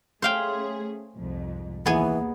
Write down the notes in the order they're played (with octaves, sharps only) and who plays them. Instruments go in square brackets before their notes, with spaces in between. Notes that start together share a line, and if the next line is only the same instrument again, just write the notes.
[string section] A3 C#4 G#4 [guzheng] C5 F5 G5
[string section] C2 F2 G#2
[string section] D#2 [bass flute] E3 [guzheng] B3 G#4 G#5